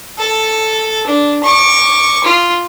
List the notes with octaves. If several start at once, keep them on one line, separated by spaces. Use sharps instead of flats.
A4
D4
C#6 D6
F4